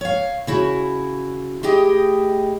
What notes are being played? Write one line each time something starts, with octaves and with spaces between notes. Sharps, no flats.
C#5 F5
C#3 E4 F#4
A3 E4 G4 G#4 D#5 G5